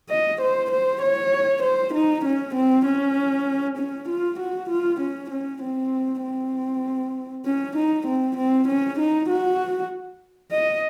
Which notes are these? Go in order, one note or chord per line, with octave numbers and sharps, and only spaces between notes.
D#5
C5
C5
C#5
C5
D#4
C#4
C4
C#4
C#4
F4
F#4
F4
C#4
C#4
C4
C4
C#4
D#4
C4
C4
C#4
D#4
F#4
D#5